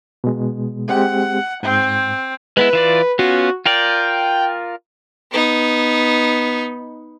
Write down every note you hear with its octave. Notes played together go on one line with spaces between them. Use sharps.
B2 G#3
G#3 C4 G4 F#5
G#2 C4
G#3 B3 E4 B4
E3 F4 D5
B3 C#4 F4 F#4
F4 A#4 D5 G5
B3 D#4